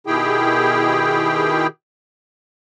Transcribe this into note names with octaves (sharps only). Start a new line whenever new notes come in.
B2 D#3 E4 G4 G#4 G5